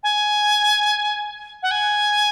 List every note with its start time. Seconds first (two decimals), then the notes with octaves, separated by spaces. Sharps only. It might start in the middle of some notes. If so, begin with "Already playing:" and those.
0.03 G#5
1.63 F#5
1.71 G#5